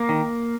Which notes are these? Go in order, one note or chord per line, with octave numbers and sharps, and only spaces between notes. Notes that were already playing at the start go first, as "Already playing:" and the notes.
Already playing: A#3
D#3